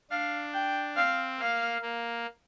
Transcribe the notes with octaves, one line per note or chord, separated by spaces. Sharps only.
D4 F5
G5
C4 F5
A#3 F5
A#3